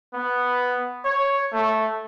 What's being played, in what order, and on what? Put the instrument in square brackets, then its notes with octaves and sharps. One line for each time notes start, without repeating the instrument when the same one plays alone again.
[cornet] B3
C#5
A3